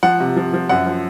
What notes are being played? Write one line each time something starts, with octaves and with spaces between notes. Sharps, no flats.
F3 F#5
C3
F3
F3
F#2 F#5
F3